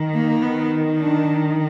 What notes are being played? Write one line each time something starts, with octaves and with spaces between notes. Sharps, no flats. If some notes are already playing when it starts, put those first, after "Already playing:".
Already playing: D#3
A#3
B3
D4